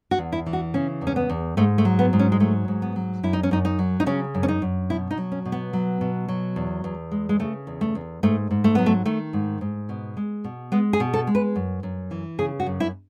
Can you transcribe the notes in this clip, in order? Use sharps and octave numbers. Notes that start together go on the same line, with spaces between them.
F#4
E2
E4
E3
F#4
C#3 C#4
E2
C#4
B3
E2
G#2 A3
A3
F#3
B3
G#2
C#4
G#3
F#3 A3
G#2
B3
F#3
F#2 E4
D#4
C#4
F#2 D#4
D#4
F#3
D#4
C#3 C#4
F#2
C#4
D#4
F#2
B2 E4
D#4
F#3
C#4
B2
B3
F#3
B2
F#3
E2
E2
G#3
G#3
C#3 A3
E2
A3
E2
G#2 A3
G#2
A3
F#3 B3
A3
D#3 A3
G#2
G#2
B2
G#3
B2
G#3 B3
G#4
B2
A4
G#3
B4
F#2
F#2
E3
C#3 G#4
F#4
F#2
E4